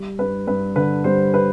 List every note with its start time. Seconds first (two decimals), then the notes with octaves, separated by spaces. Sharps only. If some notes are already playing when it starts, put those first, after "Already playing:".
Already playing: G3
0.19 G2 B4
0.47 G2 B4
0.76 D3 B4
1.04 G3 C5
1.34 B4